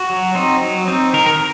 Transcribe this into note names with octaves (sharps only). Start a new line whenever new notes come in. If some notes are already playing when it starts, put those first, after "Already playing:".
Already playing: F#4
F#3
C4 D#4
F#3
C4 D#4
D#3 A#4
A#4